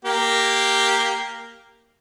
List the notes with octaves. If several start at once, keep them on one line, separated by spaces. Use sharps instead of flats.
A#3 G4